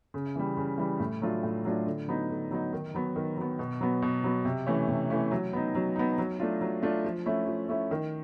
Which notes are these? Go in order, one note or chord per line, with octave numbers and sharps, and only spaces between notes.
C#3
E3 G3
C#3
E3 G3
A2
F#3 A3 D4 F4
A2
F#3 A3 D4 F4
D3
F#3 B3 D#4
D3
F#3 B3 D#4
D#3
F#3 B3
D#3
F#3 B3
B2
F#3 B3
B2
F#3 B3
C3
E3 A3 C#4
C3
E3 A3 C#4
F#3
B3 D#4
F#3
B3 D#4
F#3
A3 D4 F4
F#3
A3 D4 F4
F3
A3 C#4 E4
F3
A3 C#4 E4
D#3